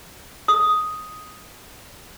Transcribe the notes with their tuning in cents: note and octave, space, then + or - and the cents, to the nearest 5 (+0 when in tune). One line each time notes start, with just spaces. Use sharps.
D#6 +5